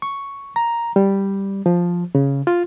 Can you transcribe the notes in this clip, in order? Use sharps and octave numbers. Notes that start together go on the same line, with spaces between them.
C#6
A#5
G3
F3
C#3
F4